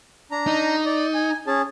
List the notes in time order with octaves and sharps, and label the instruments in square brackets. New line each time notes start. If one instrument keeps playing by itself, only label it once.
[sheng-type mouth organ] D4 A#5
[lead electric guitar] D#4
[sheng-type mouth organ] D5
G#5
C#4 G#4 A5